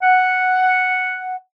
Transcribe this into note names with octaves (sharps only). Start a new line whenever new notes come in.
F#5